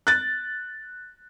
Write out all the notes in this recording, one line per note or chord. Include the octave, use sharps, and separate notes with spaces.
F#6 A6